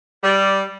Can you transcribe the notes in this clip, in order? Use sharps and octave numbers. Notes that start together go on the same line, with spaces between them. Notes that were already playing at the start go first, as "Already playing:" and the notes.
G3